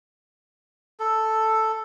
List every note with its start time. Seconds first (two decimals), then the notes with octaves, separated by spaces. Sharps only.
1.00 A4